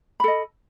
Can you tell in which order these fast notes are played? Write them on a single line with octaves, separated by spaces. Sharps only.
B5 A4 D#5